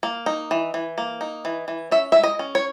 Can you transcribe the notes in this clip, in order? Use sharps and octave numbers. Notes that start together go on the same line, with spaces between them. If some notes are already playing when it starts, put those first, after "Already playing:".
A#3
D#4
E3
E3
A#3
D#4
E3
E3
C#4 E5
G#3 E5
D#5
C#4
C#5